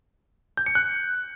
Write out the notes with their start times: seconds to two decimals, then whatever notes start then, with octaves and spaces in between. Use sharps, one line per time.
0.57 G6
0.66 C#7
0.75 F#6